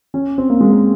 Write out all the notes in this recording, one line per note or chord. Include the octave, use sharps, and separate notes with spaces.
C#4
C4
A#3
G#3
A#3